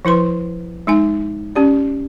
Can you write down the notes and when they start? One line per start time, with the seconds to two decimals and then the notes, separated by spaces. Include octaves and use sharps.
0.05 F3 E4 B4 C6
0.87 G#3 D#4 G#5
1.56 C#4 G4 D5